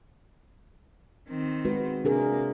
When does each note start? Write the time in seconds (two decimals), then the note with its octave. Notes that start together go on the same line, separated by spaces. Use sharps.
1.29 D#3 C4
1.65 G#3 F#4 B4
2.05 C3 A#3 D4 G#4 A#4